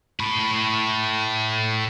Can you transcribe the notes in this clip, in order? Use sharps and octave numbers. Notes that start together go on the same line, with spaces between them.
A2 B5